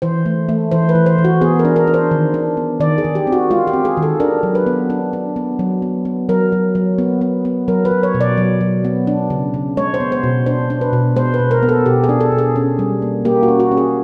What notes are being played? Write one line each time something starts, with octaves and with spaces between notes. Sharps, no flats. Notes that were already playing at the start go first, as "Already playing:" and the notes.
E3 C5
A3
A3
E3 C5
B4
E3
C5
E3
F#4
B3 G#4
A#4
D4
A#4
D4
C5
D#3
D4
B3
D#3 D5
G#4
D#3
G4
C4
F#4
G#3 F4
G4
C4
G#4
D#3
A4
D4 A#4
F#3
B4
B3
D4
D4
B3
F#3
B3
B3
F#3 A#4
F#3
F#3
B3
B3
B3
F#3 A#4
B4
F#3
C#5
B2
D5
F#3
F#3
B3
D4
C#3
C#3
G#3 C#5
C5
B3
C5
B2
D4 C5
D4
B4
B2
G#3 C5
B4
B2
A#4
B3
A4
B2 G4
G#4
D4
A4
B2
G#4
C#4
G3
A#3
A#3 G4
F#4
C#4
F#4
C#4
G#4